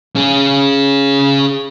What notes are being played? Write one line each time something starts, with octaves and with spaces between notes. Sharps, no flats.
C#4 G#4